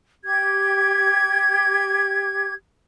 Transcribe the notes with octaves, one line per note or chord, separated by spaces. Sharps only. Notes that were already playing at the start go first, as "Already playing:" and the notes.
G4 G#6